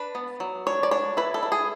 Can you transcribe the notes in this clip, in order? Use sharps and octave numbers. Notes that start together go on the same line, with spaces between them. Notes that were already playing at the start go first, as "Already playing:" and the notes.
Already playing: D4 B4
B3
F#3
D4 C#5
D5
D4 C#5
E4 B4
A4
E4
G#4